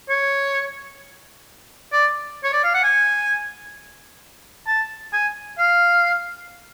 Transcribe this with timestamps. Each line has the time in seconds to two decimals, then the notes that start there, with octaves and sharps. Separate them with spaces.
0.09 C#5
1.92 D5
2.44 C#5
2.53 D5
2.64 F5
2.74 F#5
2.83 G#5
4.67 A5
5.13 G#5
5.58 F5